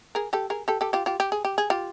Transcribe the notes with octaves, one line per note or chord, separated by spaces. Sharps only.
G#4 A#4
G4 A4
G#4 A#4
G4 A4
G4 A4
F4 G4
F4 G4
G4
G#4
G4
G#4
F4 G4